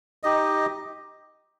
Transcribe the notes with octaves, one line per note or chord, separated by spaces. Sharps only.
D#4 G4 D#5